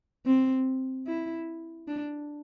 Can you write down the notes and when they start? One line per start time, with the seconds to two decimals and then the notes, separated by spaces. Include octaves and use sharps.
0.26 C4
1.07 E4
1.88 D4